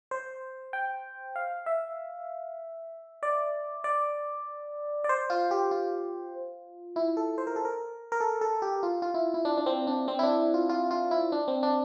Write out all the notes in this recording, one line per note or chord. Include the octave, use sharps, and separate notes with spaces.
C5
G5
F5
E5
D5
D5
D5
C5
F4
G4
F4
E4
A4
C5
A#4
A4
A#4
A#4
A4
A4
G4
F4
F4
E4
E4
D4
D4
C4
D4
C4
E4
D4
F4
F4
F4
E4
D4
C4
D4